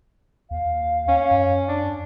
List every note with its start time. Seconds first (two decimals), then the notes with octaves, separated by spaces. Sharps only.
0.51 D#2 F5
1.08 C#4
1.31 F#2
1.69 D4